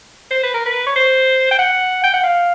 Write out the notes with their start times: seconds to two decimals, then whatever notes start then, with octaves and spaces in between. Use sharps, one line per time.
0.31 C5
0.44 B4
0.54 A#4
0.66 B4
0.87 C#5
0.96 C5
1.51 G5
1.59 F#5
2.04 G5
2.14 F#5
2.24 F5